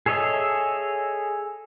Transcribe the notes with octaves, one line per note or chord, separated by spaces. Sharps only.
G#4 A4 C#5 D#5 E5